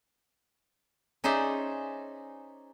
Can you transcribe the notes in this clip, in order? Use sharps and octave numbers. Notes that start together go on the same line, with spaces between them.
C#4 D#4 G#4 C5 D5 E5